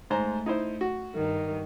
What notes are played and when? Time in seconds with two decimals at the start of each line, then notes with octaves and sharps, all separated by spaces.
0.10 G#2 A3 C5 A#5
0.46 D#4 E4 C5
0.81 F#4
1.13 G2 D#3